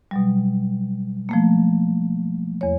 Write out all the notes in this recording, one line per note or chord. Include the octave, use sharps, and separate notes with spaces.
B2 F#3 G3
F3 A3 A#3
E2 C#5